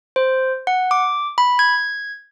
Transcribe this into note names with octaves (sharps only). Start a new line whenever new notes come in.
C5
F#5
D6
B5
G#6